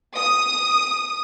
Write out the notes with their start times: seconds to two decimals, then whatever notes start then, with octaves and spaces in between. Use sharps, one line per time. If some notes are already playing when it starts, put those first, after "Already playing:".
0.16 D#6